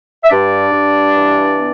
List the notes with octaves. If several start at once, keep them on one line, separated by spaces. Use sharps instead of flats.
E5
G2 D4 D5
G2
E3
B3